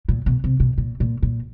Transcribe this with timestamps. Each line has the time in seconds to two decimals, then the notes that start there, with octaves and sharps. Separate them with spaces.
0.09 A#2
0.26 B2
0.44 C3
0.60 B2
0.78 A#2
1.00 A#2
1.23 A#2